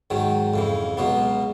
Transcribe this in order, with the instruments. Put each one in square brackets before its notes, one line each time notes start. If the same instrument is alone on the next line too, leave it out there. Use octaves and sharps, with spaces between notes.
[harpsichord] G#2 D#3 F#3
F2 C#3 E3
C#2 B2 F#3 B3